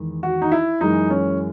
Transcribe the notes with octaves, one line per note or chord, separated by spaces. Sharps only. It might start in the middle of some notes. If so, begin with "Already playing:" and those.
Already playing: E2 D#3 G#3
F#4
D#4
E4
F#2 E3 G#3 D#4
C#4